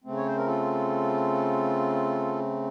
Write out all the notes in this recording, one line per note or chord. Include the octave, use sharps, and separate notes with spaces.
C#3 A3 C4
C#5
C5
A#4
F4 A4